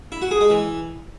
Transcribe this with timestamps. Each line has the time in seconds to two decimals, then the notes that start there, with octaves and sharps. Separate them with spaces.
0.12 E4
0.22 F#4
0.31 G#4
0.41 G#3
0.50 E3